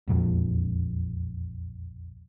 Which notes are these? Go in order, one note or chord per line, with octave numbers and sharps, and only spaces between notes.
E1 A#1 F2